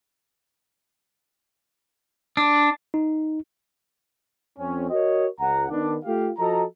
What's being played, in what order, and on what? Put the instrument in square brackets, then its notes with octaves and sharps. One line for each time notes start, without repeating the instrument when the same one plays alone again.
[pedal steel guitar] D4
[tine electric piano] D#4
[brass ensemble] F2 C4 C#4
F#4 A#4 C#5 D#5
C#2 F#5 A#5
D#3 B3 D4
A3 F4 G4 F5
F3 F#4 A4 D#5 A#5